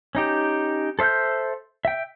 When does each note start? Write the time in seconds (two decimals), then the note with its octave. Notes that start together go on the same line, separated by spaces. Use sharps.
0.15 C#4 D#4 G4
0.99 A4 C5 E5 F6 G6
1.85 E5 G5